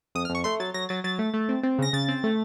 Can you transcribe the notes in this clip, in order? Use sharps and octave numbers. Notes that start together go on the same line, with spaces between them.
F2 D#6
F6
F2
C#6
A3 C6
F#3 A6
F#3 A#6
F#3 A6
F#3 A6
A3
A3
C4
C4
C#3 A#6
C#3 A6
C4
A3